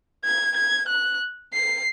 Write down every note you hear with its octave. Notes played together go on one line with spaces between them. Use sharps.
G#6
G#6
F#6
C7